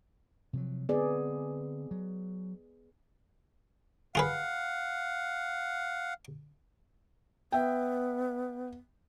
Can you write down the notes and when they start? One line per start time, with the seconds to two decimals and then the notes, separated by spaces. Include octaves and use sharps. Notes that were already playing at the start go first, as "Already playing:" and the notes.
0.53 C3 F3 F#3
0.89 D3 B3 C4 G#4 D5
1.91 F#3
4.15 F4 G#4 B4 F5 F#5
7.52 B3 E5 G5